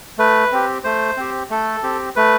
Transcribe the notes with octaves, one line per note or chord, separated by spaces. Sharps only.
A3 B4
C4 G4
A3 C5
C4 G4
A3 A4
C4 G4
A3 B4